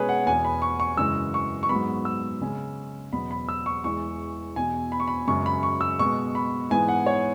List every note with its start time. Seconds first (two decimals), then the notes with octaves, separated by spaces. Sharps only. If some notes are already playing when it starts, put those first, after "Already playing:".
Already playing: B2 G#3 C#4 G#4 B4 C#5
0.09 F#5
0.26 E2 B2 B3 G#5
0.45 B5
0.62 C#6
0.80 C#6
0.97 F#2 C#3 E3 G#3 E6
1.34 C#6
1.63 C#6
1.69 G#2 F#3 B3 B5
2.05 E6
2.41 C#3 G#3 C#4
3.13 E2 B2 F#3 B3 B5
3.31 B5
3.49 E6
3.66 C#6
3.84 E2 E3 G#3 C#6
4.56 E2 B2 B3 G#5
4.92 B5
5.00 C#6
5.08 B5
5.27 F#2 C#3 G#3 C#4 C#6
5.46 B5
5.63 C#6
5.81 E6
5.99 B2 G#3 B3 C#6
6.35 B5
6.70 G#2 E3 B3 G#5
6.88 F#5
7.06 C#5